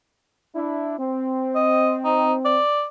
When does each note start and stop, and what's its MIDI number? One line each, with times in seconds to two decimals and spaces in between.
0.56 0.96 62
0.56 0.96 64
0.99 2.59 60
1.55 1.96 75
2.05 2.33 63
2.45 2.85 74